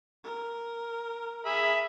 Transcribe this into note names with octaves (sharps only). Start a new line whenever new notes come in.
A#4
G#4 E5 B5